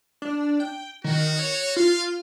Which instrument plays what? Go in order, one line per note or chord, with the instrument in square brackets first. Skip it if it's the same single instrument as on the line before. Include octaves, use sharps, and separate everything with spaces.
[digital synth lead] D4
G5
[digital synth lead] D#3 [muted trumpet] F#4
[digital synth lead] C#5
[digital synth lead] F4 [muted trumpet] F5